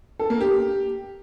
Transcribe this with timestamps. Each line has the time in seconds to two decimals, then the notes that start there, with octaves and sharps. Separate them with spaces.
0.19 A4
0.30 A#3
0.41 G4